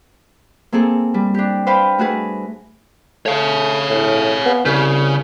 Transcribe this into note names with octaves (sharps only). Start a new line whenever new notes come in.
A#3 C4 G#4 A4
G3
D4 G4
B4 C5 F5 G5 B5 C6
A3 F#4 G#4 B4
A3 C#5 F5
A2
B3
C2 C#3